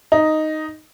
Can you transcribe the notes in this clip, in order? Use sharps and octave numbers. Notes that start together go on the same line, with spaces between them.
D#4